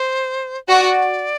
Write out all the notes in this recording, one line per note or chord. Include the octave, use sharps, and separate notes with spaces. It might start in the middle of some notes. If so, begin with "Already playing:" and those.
Already playing: C5
F#4 D5